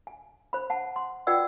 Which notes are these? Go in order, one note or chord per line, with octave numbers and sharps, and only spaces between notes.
G#5
C5 B5
F#5 A5
C6
F4 B4 D5 F#5 G5 E6